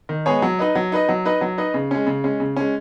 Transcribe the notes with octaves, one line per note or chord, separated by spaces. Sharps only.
D#3
G#3 B3 G#4 C#5
F#3
D#4 B4 D#5
F#3
D#4 B4 D#5
F#3
D#4 B4 D#5
F#3
D#4 B4 D#5
C#3
G#3 C#4
C#3
G#3 C#4
C#3
G#3 C#4